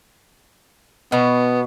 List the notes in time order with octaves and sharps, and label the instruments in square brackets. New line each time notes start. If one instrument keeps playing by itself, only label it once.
[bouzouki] B2 [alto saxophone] B3